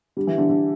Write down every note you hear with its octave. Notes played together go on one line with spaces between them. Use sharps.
D3 G3
E3
D3
D3